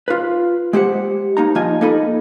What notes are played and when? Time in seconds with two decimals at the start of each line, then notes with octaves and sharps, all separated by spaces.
0.08 F4 B4
0.73 G#3 G4 C5 F#5
1.37 A#3 D#4 A#5
1.55 F3 D4 F4 D#5 G#5
1.81 A#3 D#4 A4 D#5 B5